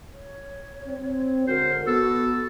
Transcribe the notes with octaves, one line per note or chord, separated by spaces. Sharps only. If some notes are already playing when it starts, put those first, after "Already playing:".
C#5
C4
D3 G#3 F#4 A#4 C5
B3 F#4 A4